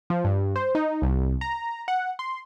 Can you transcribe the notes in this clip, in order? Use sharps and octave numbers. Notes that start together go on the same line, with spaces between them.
F3
G2
C5
D#4
C2
A#5
F#5
C6